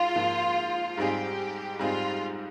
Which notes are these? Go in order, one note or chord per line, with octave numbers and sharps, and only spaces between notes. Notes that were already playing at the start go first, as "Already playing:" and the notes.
Already playing: G#2 F4
G#2 F3 A#3
G#2 G3 C4 D#4 G4 G#4
G#2 G3 C4 D#4 F4 G#4